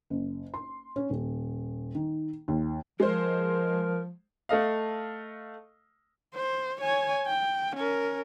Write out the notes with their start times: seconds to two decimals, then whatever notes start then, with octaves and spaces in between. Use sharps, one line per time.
0.10 F#1
0.54 C6
0.96 C#4
1.10 D#1
1.95 D#3
2.48 D#2
3.00 F3 G#3 A#4 C5
4.49 A3 A4 D#5 F5
6.35 C5
6.81 C#5 G#5
7.27 G5
7.76 C#4 A#4